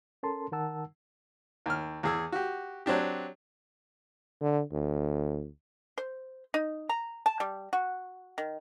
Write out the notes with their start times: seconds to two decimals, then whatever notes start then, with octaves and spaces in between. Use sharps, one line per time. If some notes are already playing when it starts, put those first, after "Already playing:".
0.23 C#4 A4 A#4 A5 C6
0.52 D#3 D#4 A#4 F#5 A5 E6
1.66 D#2 F6
2.03 E2 G#4 E6
2.32 F#4 G4
2.86 F#3 C4 D4 G4
4.41 D3
4.73 D2
5.98 C5
6.54 D#4
6.89 A#5
7.26 A5
7.40 G3
7.73 F#4
8.38 D#3